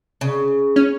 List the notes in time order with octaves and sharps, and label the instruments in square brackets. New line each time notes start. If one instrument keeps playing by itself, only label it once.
[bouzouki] C#3
[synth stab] C#4